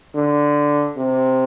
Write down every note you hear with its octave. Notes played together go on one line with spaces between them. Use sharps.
D3
C3